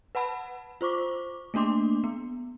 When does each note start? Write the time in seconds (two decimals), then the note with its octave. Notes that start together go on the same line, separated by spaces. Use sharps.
0.15 B4 F#5 A5 B5
0.81 F4 C5 C#6 D6
1.54 A3 A#3 D4 C6 D6
2.04 B3